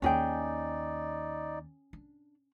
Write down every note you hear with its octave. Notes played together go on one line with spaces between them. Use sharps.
D#2 A#3 C#4 D#4 G#4 D5 G5
D4